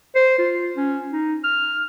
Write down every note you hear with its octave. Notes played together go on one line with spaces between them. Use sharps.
C5
F4
C#4
D#4
F6